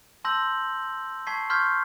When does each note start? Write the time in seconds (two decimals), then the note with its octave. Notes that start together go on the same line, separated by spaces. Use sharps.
0.25 A5 C6 E6 G6 A#6 F#7
1.27 A5 C#6 G#6 B6 C7
1.50 C6 C#6 F6 G6 G#6 B6